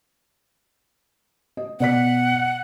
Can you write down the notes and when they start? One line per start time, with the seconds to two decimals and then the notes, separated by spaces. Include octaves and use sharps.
1.57 D#5
1.80 B2 D5 F#5 B6